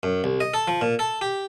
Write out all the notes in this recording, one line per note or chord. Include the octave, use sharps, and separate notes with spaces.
F#2
C2
D#5
A4
F3
A#2
A4
G4